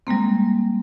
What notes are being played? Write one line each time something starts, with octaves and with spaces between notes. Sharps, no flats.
G3 G#3 A#3 C4